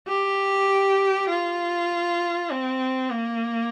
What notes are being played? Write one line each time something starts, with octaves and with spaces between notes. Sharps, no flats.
G4
F4
C4
A#3